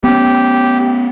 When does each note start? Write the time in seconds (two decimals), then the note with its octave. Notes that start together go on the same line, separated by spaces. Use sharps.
0.04 B3 C#4 G4